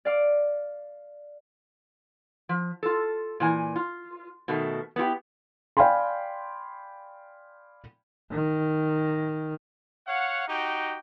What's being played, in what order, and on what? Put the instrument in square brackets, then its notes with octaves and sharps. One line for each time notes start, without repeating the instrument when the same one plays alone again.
[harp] D5 F5 D6
[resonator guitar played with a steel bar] F3
F4 A4
A#2 E3 G#5
F4
B2 D#3 A3
B3 E4 F4 G4
[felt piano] D5 F5 G5 G#5 B5 C6
[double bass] D#3
[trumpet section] C#5 F5 F#5
D#4 F#4 G4 G5